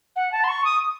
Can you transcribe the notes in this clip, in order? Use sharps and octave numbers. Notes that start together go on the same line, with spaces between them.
F#5
A5
C6
C#6
D#6